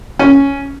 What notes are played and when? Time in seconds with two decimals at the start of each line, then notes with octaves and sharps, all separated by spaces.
0.19 C#4